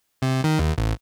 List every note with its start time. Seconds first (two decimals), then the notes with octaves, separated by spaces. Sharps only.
0.22 C3
0.44 D#3
0.59 D#2
0.78 A1